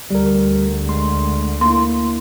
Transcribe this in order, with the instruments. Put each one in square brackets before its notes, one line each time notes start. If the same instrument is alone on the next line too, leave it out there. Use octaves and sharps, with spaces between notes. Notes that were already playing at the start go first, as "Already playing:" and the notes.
[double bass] D2 [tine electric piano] G3 A#4
[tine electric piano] G#3 C6
[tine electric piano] A#3 E4 [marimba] C6